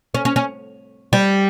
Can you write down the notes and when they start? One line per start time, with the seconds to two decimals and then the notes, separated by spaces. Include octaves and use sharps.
0.14 C#4
0.25 C#4
0.36 C#4
1.13 G3